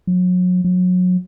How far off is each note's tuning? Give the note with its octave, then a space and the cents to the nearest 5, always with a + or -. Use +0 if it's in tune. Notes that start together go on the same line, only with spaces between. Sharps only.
F#3 -35
F#3 -30